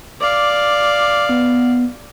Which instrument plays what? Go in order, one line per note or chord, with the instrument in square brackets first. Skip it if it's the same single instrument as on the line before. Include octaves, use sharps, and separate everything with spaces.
[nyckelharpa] D5 F5 [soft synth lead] D6
[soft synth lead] B3